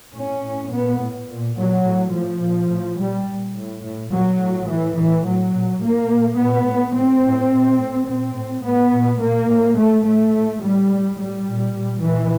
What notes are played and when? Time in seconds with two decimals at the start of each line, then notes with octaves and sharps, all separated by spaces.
0.15 A2 C#4
0.43 A2
0.72 A#2 B3
1.00 A2
1.29 A#2
1.56 A#2 F#3
1.85 A2
2.13 A2 F3
2.41 A#2
2.69 A2
2.98 A#2 G3
3.26 A#2
3.55 A2
3.83 A2
4.10 A#2 F#3
4.38 A2
4.67 A2 E3
4.95 A2 E3
5.24 A2 F#3
5.52 A#2
5.80 A2 A#3
6.08 A#2
6.36 A#2 B3
6.64 A2
6.92 A2 C4
7.21 A2
7.50 A#2
7.77 A2
8.05 A#2 C4
8.34 A2
8.62 A2 B3
8.90 A#2
9.19 A#2 A#3
9.47 A2
9.75 A2 A3
10.03 A2 A3
10.32 A2
10.60 A2 G3
10.88 A2
11.16 A2 G3
11.44 A#2
11.73 A#2
12.01 A#2 E3